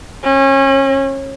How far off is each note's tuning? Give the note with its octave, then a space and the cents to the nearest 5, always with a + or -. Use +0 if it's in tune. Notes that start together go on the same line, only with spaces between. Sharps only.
C#4 -30